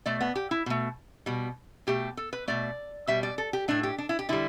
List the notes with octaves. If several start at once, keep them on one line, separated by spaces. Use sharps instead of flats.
B2 A3 D5
B3
G4
E4
B2 A3
B2 G3
B2 A3 G4
A4
B4
B2 A3 D5
B2 G3 E5
D5
A4
G4
A2 A3 D4
G4
D4
E4
G4
D3 G3 E4